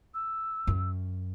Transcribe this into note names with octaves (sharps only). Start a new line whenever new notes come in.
E6
F#2